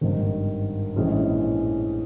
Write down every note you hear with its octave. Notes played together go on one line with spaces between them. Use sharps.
G#1 G2 D#3
A#1 A2 E3 G#3 C#4